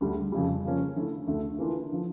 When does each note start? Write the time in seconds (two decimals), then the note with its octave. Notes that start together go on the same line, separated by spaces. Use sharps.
0.01 D2 D3 G3
0.32 F2 C#3 G3
0.64 C#3 F3 A#3 C#4
0.96 D3 A3 E4
1.27 D2 D3 A3
1.59 E3 A#3 D4 F4
1.92 D3 F3